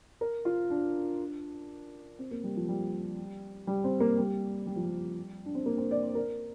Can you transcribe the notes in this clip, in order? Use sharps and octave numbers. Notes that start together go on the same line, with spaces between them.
A#4
F4
D4
C4
A#3
G3
F3
G3
G3
C4
A#3
G3
G3
F3
G3
D4
C4
A#3
C4
D5
C5
A#4